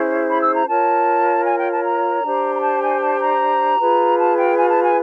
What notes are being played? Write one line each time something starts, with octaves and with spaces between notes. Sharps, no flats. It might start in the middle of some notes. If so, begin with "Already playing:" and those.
Already playing: C#4 E4 G#4 C5
B5
E6
A#5
F4 A#4 C#5 A5
G#5
G5
A5
A#5
D4 G4 C5
A#5
A5
G#5
A5
A#5
F4 G#4 B4
A5
G5
G#5
A5
G#5